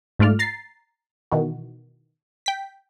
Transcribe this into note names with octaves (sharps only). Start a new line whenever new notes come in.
G#2 A3 F4 D5 F6
A#5 A6 C7
B2 D#3 E3 F#4
G5 B6